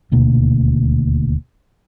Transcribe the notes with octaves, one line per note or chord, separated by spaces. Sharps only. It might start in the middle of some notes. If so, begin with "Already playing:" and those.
D#1 D2 B2 A#3